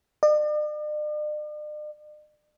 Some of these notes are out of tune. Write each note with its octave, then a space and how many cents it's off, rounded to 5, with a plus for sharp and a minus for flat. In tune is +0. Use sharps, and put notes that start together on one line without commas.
D5 +45